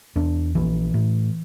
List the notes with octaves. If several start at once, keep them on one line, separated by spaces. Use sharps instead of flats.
E2 D4
A#1 E3
A2